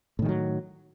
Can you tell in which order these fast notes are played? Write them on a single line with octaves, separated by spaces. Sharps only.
A2 D#3 G#3 F#3